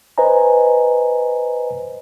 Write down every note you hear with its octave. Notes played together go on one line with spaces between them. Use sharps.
B4 C5 D#5 G#5 A#5